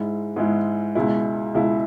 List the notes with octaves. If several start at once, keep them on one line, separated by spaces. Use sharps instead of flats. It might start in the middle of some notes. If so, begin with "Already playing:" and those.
Already playing: G#2 G#3 E4
G#2 G#3 E4
C#2 B2 G#3 E4
C#2 B2 G#3 E4